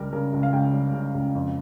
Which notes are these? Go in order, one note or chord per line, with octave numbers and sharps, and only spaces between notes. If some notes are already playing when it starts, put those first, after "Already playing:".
Already playing: C#2 G3 A#4
C#3 A#4
C#2
F5
C#2 G5
G3
C#3
C#2
F2